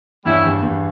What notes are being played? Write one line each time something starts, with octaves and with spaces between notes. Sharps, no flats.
E2 G2 G3 C#4 E4
E2 G2
E2 G2